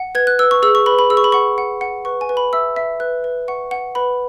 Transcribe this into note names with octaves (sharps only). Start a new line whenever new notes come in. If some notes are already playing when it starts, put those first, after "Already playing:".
Already playing: F#5
B4 G#6
F#6
B4 E6
C#6
G#4 E6
C#6
B4 B5
B5
G#4 E6
C#6
B5
F#5 C#6
F#5
F#5
B4 C#6
G#5
B4
B5
E5 E6
E5
B4 F#6
B4
F#5 C#6
F#5
B4 B5